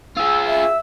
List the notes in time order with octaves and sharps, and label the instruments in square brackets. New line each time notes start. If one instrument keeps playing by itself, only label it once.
[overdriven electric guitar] F4 G#4 [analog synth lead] E6
[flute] E5